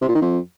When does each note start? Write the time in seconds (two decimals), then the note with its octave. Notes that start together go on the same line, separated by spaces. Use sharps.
0.01 C3
0.08 A#2
0.15 D#3
0.22 F2